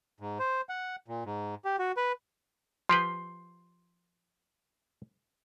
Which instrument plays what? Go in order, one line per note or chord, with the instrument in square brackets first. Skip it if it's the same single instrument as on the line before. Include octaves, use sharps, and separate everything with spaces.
[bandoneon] G#2
C5
F#5
A#2
G#2
G4
F#4
B4
[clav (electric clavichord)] F3 G4 B4 [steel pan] C6